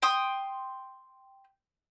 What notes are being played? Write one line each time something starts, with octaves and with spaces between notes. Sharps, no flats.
G5 C6 D#6